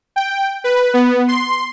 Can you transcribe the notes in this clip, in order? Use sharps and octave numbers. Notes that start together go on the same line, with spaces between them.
G5
B4
B3
C6